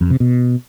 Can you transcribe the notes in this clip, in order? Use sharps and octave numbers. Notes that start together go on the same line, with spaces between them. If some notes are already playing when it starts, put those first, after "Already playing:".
F2
C3
B2